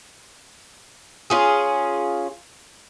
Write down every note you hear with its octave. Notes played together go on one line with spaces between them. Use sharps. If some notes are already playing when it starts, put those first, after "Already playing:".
C#4 F4 G#4